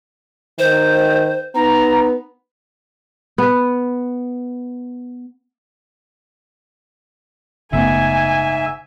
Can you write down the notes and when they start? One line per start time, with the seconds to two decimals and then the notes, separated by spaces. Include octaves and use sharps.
0.59 D#3 C5
1.55 B3 D#4 A#5
3.38 B3 B4
7.73 F#1 G#2 C#3 A3 B3 E5 G#5